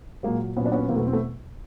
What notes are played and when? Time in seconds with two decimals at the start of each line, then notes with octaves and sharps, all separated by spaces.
0.23 A#2 F#3 G#3 A#3
0.56 A#2 F#3 B3 C#4
0.66 D4
0.72 B3 C#4
0.88 E2 B2 F#3 A#3 C4
0.96 A3 B3
1.07 C4
1.13 A3 B3